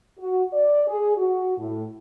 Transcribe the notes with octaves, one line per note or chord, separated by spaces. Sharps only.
F#4
D5
G#4
F#4
A2